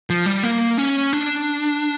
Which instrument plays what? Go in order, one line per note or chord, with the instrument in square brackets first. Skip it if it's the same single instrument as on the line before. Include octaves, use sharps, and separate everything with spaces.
[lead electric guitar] F3
G3
A#3
C#4
D4